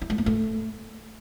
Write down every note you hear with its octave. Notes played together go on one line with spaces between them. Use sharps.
E4
G#3
A#3
A3